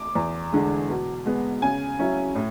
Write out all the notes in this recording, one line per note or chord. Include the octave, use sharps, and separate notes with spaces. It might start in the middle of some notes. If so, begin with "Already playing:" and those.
Already playing: D6
E2
D3 G#3
B2
G#3 B3
C#3 G#5
F#3 C#4 E4
A2